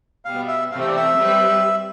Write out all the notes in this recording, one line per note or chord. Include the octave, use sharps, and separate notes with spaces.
B2 G3 B3 F5
E5
C3 E3 A3 C4 G4 F5
E5
D5
E5
G3 C4 G4 B4